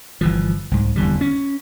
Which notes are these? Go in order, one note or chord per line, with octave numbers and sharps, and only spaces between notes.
G1 E3 F3
C2 G#2
F1 E2 D3 G3
C#4